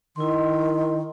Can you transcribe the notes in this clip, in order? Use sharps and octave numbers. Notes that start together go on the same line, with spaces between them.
D#3 E4 D#5 C6